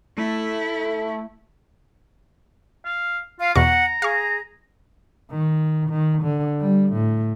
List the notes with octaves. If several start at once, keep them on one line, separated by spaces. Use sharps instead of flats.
A3 E4
F5
F4 F5
E2 B2 F#5 A#5 C#6
G#4 F5 C#6
D#3
D#3
D3
G3
A2